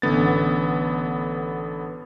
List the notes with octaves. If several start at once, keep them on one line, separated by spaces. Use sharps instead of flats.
A1 D3 B3 A6